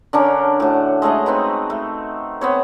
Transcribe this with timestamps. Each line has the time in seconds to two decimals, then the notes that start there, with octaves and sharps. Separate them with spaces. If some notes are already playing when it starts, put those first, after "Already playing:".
0.13 D3 C#4 D4 A#4
0.60 A2 F#4
1.02 G#3 A3 C#5 D#5
1.26 C4 D#4 B4
1.70 A3
2.41 B3 C4 C#5